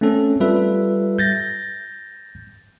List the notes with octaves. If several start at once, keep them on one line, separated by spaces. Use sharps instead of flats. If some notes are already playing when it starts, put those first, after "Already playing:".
A3 C4 C#4 A4
G3 F4 A4 B4 E5
G6 A6 A#6